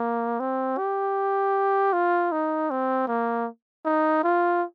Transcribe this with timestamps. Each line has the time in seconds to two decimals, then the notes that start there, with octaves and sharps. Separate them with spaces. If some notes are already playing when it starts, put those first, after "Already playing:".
Already playing: A#3
0.40 C4
0.78 G4
1.93 F4
2.32 D#4
2.70 C4
3.08 A#3
3.85 D#4
4.24 F4